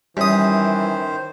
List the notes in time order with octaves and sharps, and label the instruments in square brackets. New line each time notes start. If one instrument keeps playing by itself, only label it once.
[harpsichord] F#2 D#6 [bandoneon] D#3 C5 [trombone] E3 [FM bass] G3